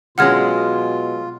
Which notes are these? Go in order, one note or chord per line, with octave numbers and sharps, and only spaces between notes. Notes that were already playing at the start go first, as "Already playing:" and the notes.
B2 F#3 G#3 C#4 F4 F#5 F6 G#6